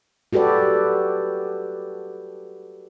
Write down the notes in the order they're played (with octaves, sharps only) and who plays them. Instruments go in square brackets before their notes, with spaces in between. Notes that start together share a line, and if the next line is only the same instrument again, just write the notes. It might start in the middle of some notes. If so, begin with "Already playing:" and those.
[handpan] F#4 G4 A4 B4 D5